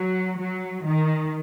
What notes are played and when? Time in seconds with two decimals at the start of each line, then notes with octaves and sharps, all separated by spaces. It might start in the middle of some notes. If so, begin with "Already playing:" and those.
Already playing: F#3
0.40 F#3
0.87 D#3